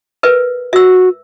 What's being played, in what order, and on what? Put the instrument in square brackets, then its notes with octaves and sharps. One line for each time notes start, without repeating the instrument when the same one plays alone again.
[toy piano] A#4 B4 E5
[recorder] F#4 [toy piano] E5 E6